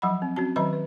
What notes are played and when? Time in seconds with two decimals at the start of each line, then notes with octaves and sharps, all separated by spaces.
0.02 F3 F#3 D#5 F#5 B5
0.22 C4
0.36 C4 C#4 F#4 A5
0.56 D#3 F#3 B4 D#5 A#5 B5
0.73 B4